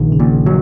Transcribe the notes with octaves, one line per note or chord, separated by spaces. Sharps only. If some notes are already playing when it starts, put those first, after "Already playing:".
Already playing: A#1 D#3
C#3
A#2
F#3